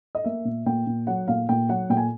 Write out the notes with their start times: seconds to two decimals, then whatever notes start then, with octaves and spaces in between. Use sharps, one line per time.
0.15 D#5
0.24 A#3 E5
0.45 A#2
0.66 A#2 G5
0.87 A#2
1.07 F#3 F#5
1.28 A#2 F5
1.49 A#2 G5
1.69 F#3 F#5
1.90 A#2 G5
1.97 G#5